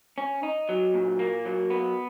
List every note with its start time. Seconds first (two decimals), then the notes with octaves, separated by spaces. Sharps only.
0.18 C#4
0.43 D#4
0.69 F#3
0.94 A#2
1.19 A#3
1.45 F#3
1.70 B3